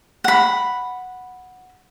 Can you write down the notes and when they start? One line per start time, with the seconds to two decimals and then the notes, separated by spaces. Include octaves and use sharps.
0.24 F#5 B5